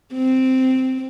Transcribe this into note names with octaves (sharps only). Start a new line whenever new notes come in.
C4